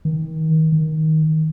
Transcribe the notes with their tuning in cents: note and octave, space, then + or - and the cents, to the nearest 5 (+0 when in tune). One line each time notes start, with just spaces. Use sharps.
D#3 +30
D#3 +15